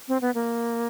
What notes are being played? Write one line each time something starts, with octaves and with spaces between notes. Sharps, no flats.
C4
B3
A#3